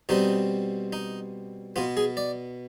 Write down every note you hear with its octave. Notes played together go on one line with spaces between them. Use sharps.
B2 G3 C4 D#4
D#4
B2 B3 F4
G#4
D5